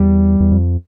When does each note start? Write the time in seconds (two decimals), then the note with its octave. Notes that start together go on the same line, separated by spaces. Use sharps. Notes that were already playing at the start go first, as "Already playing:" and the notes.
Already playing: E2 G3
0.40 E2
0.51 F2